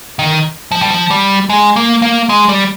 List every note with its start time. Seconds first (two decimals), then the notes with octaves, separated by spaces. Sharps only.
0.19 D#3
0.71 F3
0.81 G3
0.90 F3
1.11 G3
1.50 G#3
1.76 A#3
2.02 A#3
2.29 G#3
2.49 G3